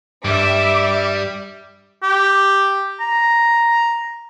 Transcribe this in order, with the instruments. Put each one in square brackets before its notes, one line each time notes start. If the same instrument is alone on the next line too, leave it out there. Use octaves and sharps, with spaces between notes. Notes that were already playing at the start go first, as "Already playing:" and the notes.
[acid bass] G2 [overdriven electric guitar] G3 [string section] E5 D6
[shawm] G4
A#5